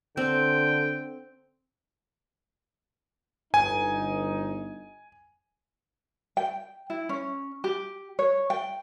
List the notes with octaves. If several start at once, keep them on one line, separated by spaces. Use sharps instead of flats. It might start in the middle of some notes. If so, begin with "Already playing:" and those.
D3 C4 G5
G1 D#4 G#5
G5
E4
C#4
G4
C#5
G5